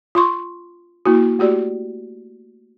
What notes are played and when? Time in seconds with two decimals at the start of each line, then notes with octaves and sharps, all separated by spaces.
0.15 F4 C6 C#6
1.05 A#3 E4 F#4
1.39 A3 F#4 G4 D5